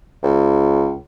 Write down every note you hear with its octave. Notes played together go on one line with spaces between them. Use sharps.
C#2